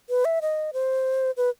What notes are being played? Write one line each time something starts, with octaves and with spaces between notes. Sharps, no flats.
B4
E5
D#5
C5
B4